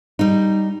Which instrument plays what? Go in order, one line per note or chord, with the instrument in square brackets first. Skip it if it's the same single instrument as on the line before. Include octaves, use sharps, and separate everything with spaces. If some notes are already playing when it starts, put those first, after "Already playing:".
[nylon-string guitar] G3 D#4